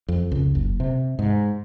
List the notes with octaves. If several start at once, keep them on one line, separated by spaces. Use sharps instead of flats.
F2
C#2
F#1
C3
G#2